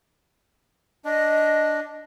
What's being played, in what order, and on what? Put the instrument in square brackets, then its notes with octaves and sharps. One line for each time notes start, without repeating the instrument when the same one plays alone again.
[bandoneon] D4 [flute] D#5